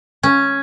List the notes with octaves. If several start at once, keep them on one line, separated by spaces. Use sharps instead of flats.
C#4